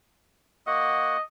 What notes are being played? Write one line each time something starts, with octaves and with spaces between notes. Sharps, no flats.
A#3 F#4 D#5 F#5